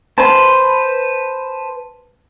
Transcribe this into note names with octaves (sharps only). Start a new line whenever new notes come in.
B4 C5 A5